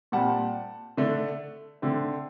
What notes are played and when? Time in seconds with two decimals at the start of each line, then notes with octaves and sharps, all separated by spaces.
0.12 A#2 G3 C4 F#5 A5
0.97 D3 A3 D4
1.82 D3 A3 C4